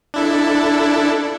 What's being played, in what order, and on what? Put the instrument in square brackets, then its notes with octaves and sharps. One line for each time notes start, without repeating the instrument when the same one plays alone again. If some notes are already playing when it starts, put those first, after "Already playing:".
[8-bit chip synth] D4 E4 A4